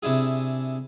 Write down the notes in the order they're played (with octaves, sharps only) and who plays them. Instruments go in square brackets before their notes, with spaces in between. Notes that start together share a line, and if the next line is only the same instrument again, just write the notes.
[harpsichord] C3 D4 E4 G#4